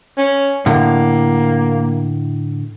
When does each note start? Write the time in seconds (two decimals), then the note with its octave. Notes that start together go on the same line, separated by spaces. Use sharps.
0.18 C#4
0.66 A2 D3 A#3